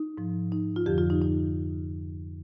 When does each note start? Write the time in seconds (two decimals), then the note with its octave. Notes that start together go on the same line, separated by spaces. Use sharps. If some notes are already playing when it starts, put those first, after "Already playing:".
Already playing: D#4
0.18 G#2 F3
0.52 D#4
0.76 F4
0.86 F2 D3 F3 G4
0.98 F4
1.10 D#4
1.21 D#4